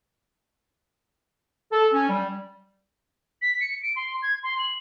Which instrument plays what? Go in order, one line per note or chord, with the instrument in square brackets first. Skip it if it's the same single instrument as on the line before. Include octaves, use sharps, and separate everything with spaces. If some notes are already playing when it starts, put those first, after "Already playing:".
[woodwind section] A4
C#4
G3
[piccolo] B6
C#7
D7
C6
G#6
C6
F#7